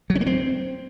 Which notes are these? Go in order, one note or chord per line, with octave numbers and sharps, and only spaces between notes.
F#3
C#4
A#3
C4